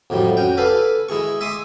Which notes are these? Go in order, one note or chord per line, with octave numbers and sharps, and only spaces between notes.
F2 A2 F#3 G3
C#4 F#4 G5
A4 B4 F5 G#5 B5 D6
G#3 E4 G#4 C#6
E5 G#5 C6 D6 D#6